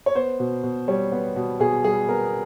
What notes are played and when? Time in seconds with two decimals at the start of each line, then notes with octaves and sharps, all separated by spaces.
0.06 C#5
0.15 B3 C5
0.40 B2
0.64 B2
0.88 G3 C#5
1.12 B3
1.36 B2
1.60 B2 G#4
1.84 G3 G#4
2.08 B3 A#4